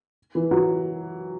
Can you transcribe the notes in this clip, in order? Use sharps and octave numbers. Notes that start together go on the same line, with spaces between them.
E3
F#3